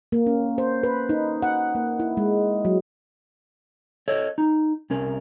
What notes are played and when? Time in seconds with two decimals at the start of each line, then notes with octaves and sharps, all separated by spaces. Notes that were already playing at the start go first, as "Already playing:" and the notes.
0.12 A#3
0.26 C#4
0.58 C5
0.83 B4
1.09 D#4
1.42 F#5
1.75 A#3
2.00 E4
2.17 G#3
2.65 F#3
4.08 A4 C#5 D#5
4.38 D#4
4.90 C2 C#4 A#4